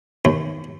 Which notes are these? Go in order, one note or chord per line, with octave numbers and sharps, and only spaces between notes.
D#2